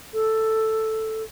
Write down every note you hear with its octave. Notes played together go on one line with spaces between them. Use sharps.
A4